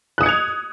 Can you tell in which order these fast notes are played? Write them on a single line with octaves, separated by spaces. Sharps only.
F#6 D#6 C#7 G#6 F7